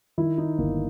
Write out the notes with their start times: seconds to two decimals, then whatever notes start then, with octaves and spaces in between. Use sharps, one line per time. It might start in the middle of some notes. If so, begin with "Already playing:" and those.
0.18 D#3 E4
0.38 D#4
0.58 G1 A#3